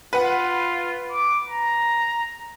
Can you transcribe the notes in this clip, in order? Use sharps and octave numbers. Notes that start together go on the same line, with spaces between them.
F4 B4 F#5
D6
A#5